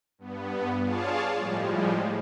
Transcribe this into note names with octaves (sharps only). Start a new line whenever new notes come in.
G2 B3
F4 G#4 C#5 D5 F5 A5
A2 F3 G3 G#3